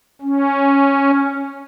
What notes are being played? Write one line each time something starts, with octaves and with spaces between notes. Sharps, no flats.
C#4